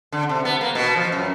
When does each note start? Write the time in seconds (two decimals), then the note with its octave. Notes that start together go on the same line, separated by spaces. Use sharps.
0.12 D3
0.29 C3
0.45 B3
0.61 A#3
0.75 B2
0.96 F3
1.12 F#2